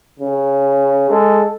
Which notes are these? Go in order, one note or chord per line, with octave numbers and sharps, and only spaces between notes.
C#3
G#3 A4